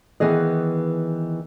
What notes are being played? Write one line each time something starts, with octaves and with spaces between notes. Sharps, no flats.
D#3 E3 B3 G#4 D#5